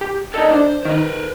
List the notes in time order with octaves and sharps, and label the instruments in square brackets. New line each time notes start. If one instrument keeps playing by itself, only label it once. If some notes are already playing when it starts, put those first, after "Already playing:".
[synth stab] G4
[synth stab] D#4 A4 [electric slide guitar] A#4 D5 D#5
[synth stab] D4 [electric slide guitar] C5
[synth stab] D#3 [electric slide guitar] A#4 B4